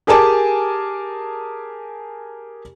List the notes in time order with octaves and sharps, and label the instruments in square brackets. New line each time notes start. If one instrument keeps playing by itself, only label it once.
[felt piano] G4 G#4 A#4 G#5 A5 D6